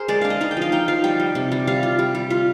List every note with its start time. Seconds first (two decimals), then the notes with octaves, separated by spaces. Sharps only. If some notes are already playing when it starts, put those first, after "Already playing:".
Already playing: G#4 A#4 C5
0.08 G#3 D5
0.22 D4 F5
0.30 D#5
0.41 D#4 D#5
0.51 G5
0.57 F3 F5
0.72 D#4 G5
0.88 F3 F5
1.04 G3 G5
1.20 G3
1.35 C3
1.52 G3
1.67 G3 F5
1.83 F4
1.99 G3
2.15 G3
2.30 F4